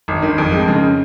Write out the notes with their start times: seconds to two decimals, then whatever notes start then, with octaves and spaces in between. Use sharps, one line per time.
0.08 G#1
0.22 D#3
0.38 F2
0.52 G#3
0.68 C#3